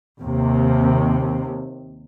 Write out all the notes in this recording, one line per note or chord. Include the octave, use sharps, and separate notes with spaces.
D#2 C3